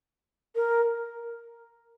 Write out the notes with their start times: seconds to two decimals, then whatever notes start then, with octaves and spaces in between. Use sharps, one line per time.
0.56 A#4